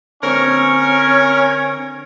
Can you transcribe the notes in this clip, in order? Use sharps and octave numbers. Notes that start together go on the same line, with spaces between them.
D3 C4 C#4 A#4 C#5